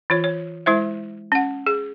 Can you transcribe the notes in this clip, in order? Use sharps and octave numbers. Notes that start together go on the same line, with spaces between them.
E3 F4 C#5
C#5
G#3 E4 C5 E5
C#4 F#5
G#4